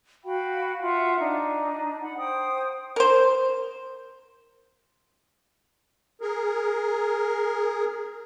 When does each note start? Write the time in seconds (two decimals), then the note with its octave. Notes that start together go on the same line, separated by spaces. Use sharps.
0.24 F#4 F5 G5 B5
0.82 F4 E5 F#5
1.19 D4 D#4
2.01 F#5 B5
2.17 C5 G5 D#6
2.96 A#4 C5
6.21 G#4 A#4